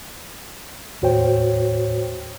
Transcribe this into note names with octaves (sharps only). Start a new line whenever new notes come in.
D#2 A2 F#4 C5 C#5 G5